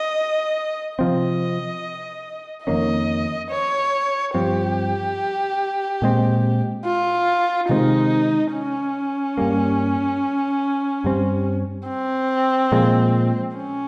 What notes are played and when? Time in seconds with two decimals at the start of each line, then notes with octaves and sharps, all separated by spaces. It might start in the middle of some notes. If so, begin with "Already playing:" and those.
Already playing: D#5
0.99 C3 F3 C4 D#5
2.66 F2 D#3 A#3 C#4 D#5
3.50 C#5
4.34 G2 F3 C4 G4
6.02 A#2 G#3 C4
6.85 F4
7.69 C3 D#3 G#3 C4 D#4
8.53 C#4
9.38 G2 G3 A#3
11.04 G2 G3 C4
11.88 C4
12.72 A#2 F3 G#3
13.56 C#4